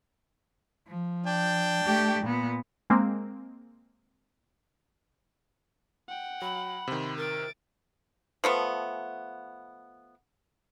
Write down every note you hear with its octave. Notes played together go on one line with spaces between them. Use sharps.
F3
D4 G5
A3 G4
A#2 B3
G#3 A#3 C4
F#5 G5
F#3 B5
C3 D#3 C6
A#4 A6 D7
F3 A3 B3